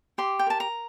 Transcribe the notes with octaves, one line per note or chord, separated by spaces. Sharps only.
G4 C6
G5
A#4 A5
A#5